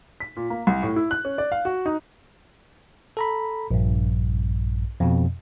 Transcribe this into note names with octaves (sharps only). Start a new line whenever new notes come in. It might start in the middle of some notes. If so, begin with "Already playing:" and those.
B6
A#2
A#3
C2
A2
E4
F#6
C#4
D5
F5
F#4
D#4
A4 A#5 B5
A#1 G2
F2 B2